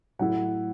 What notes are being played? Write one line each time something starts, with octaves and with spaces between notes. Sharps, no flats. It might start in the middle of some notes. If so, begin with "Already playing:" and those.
A2 F#3 A3 E4 F#5